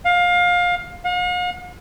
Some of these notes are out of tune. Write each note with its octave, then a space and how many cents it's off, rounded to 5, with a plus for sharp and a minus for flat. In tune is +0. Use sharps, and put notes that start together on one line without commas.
F5 +20
F5 +45